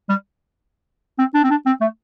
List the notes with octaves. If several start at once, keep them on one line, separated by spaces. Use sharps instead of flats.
G3
C4
D4
C4
D4
C4
A3